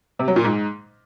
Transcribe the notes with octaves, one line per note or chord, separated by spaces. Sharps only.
C3
F#3
A#2
G#2